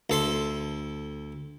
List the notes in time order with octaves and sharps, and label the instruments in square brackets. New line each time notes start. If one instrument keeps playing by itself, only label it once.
[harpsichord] D2 A4 C6